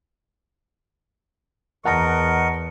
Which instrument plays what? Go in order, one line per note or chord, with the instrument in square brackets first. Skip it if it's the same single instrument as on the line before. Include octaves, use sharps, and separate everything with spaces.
[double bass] E2 [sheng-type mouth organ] A#4 D#5 [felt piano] F#5 A5 A#5 [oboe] C#6